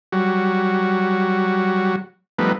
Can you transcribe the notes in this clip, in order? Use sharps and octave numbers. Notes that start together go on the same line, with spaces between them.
F#3 G3 F#4
F3 G3 A3 B3 D#4 B4